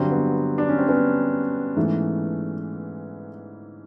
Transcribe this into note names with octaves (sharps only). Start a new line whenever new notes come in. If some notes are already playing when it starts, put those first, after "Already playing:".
Already playing: G2 D3 F#3 C4
B3
D4
C#4
C4
B3 C#4
G#2 E3 A3